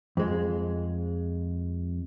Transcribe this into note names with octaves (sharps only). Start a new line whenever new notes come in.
F2 G#3